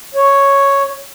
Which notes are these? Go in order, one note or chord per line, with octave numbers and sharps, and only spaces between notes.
C#5